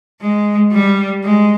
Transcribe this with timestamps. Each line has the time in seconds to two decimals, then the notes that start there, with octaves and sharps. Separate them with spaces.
0.21 G#3
0.72 G3
1.24 G#3